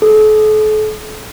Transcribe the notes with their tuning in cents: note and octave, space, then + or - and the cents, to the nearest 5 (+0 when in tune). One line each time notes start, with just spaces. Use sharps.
A4 -40